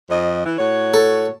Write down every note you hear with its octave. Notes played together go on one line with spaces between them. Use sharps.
F2 D#5
E3
A2 F#4 C#5
A4